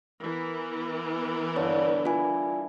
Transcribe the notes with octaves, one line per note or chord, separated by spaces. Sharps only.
E3 B3 A#4
G2 D3 C#5
E4 F4 D5 G#5